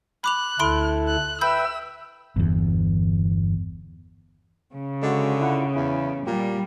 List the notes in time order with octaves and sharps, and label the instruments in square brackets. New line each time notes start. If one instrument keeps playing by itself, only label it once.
[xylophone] B5 D6 F7 [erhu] F#6
[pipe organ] D2 E4 A4 [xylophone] B5 C6 D7
[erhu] F#6
[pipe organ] B4 E5 G5 [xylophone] B5 G6 [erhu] E6
[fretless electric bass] G1 E2
[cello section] C#3
[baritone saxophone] D3 [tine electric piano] G#3 F#4
[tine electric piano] E4 F4 F#5
[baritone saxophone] E2 [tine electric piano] E4
[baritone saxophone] A#2 [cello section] G3 [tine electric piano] G4